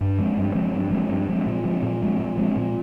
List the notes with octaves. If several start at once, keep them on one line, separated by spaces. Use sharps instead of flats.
G2
F3 G#3 C4
G2
F3 G#3 C4
G2
F3 G#3 C4
G2
F3 G#3 C4
A#2
F3 G#3 C4
A#2
F3 G#3 C4
A#2
F3 G#3 C4
A#2